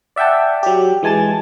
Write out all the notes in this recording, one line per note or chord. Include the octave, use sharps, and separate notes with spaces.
D5 E5 F#5 G5 A5
F#3 G4
E3 G#3 G#5 A5 A6